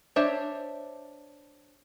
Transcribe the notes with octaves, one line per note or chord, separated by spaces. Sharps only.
D4 C5 C#5 E5